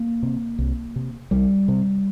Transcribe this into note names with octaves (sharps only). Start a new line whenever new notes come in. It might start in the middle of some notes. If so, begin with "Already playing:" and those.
Already playing: A#3
C3
C2
C3
C2 G3
C3